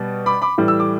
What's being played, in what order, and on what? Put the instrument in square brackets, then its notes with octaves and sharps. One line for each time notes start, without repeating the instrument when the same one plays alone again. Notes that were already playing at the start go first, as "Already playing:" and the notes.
Already playing: [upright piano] B2 G3
B5 D6
B5 D6
A2 E3 G3
E6
D6